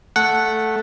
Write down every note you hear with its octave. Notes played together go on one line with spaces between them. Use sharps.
A3 F#5